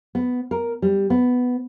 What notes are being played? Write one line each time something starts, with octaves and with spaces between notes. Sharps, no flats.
B3
A#4
G3
B3